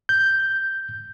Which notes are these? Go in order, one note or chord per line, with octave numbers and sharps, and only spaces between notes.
G6